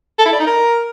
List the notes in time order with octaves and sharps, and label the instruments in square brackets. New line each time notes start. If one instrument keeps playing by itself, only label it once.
[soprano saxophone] A4
E4
D5
D#4
A#4